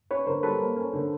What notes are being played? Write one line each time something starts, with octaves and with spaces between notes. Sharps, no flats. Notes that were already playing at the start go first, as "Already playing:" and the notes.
C#4 B4 C#5
D3 A#4 C5
G3 A4 B4
A#3
C#4
D3